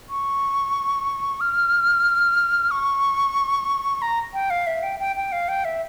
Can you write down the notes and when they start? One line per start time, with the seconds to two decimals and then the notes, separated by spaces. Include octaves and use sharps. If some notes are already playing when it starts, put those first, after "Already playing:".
0.09 C#6
1.41 F6
2.71 C#6
4.02 A#5
4.34 G5
4.50 F5
4.67 E5
4.83 G5
5.00 G5
5.16 G5
5.32 F5
5.49 G5
5.65 E5